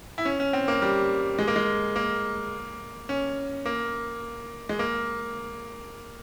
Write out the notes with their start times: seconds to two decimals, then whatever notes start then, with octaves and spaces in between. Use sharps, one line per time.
0.18 E4
0.25 C#4
0.40 C#4
0.53 C4
0.68 A#3
0.82 G3
1.39 G#3
1.47 A#3
1.56 G#3
1.96 A#3
3.09 C#4
3.66 A#3
4.69 G#3
4.79 A#3